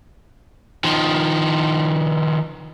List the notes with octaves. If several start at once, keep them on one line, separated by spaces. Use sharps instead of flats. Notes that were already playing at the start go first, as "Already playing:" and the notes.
D#3 F3